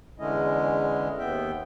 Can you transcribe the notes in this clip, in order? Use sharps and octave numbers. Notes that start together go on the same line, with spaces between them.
E2 D3 G#3 C#4 E4 D#5
D#2 B3 E5 G5